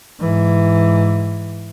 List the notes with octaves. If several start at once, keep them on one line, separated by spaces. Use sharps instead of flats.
G#2 E3